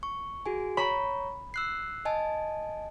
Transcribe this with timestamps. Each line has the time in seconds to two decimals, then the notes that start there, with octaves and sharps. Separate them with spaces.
0.03 C#6
0.46 F#4 G#4 G#5
0.77 C#5 A#5 B5 C#6
1.54 E6 F#6 C7
2.05 D#5 G#5 A5